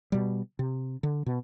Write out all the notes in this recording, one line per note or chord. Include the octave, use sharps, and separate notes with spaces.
B2 G3
C3
D3
B2